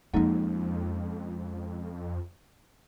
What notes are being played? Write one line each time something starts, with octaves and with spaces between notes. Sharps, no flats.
F2 F3 G#3 A#3 C#4 D#4